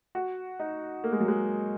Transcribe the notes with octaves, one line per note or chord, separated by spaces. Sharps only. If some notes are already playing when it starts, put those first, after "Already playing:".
F#4
D#4
A#3
G#3
F#3
G#3